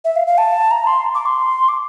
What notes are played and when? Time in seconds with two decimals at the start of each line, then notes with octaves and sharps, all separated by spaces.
0.05 E5
0.16 F5
0.27 F5
0.38 A5
0.71 A#5
0.87 C6
1.15 D6
1.26 C6
1.69 D6